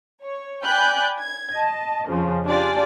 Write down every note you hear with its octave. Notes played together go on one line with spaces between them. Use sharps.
C#5
D5 G5 G#5 B5 F#6 G6
G#6
D#5 A5
F2 C#3 F3
D4 F4 G4 G#4 D5